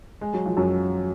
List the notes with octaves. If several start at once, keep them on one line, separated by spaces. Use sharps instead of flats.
G#3
F#3
F3
F#2 F#3